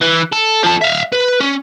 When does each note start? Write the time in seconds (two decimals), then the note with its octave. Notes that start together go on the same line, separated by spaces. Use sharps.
0.02 E3
0.33 A4
0.63 F3 A4
0.82 E5 F5
1.12 B4
1.40 C#4